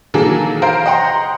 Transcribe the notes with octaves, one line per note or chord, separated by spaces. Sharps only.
D#3 E3 F#3 A#3 G#4 A4
C5 F5 A#5 G6 D7
D#5 F#5 G5 A#5 C6